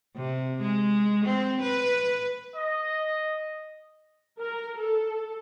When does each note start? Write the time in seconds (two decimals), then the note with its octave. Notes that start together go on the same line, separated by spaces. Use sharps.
0.16 C3
0.61 G#3
1.25 C4
1.62 B4
2.55 D#5
4.40 A#4
4.78 A4